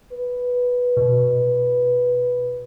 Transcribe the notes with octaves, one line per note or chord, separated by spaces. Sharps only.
B4
B2